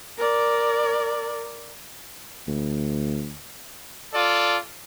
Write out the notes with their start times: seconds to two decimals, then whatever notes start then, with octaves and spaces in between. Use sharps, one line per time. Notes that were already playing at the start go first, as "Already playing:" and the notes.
0.18 A#4 D5
2.47 D2
4.14 F4 A4 D5